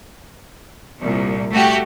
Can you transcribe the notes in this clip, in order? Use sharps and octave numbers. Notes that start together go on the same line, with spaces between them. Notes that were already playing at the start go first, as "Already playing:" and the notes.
C2 A#2
A3 F#4 G4